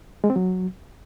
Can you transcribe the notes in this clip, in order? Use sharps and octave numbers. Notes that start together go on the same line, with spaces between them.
G#3
C4
F#3